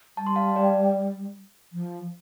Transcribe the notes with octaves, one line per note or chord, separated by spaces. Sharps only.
G3 A5
C6
F5 A5
D5 G5
F3